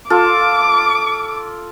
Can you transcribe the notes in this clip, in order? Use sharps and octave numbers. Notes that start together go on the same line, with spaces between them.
F4 A4 D6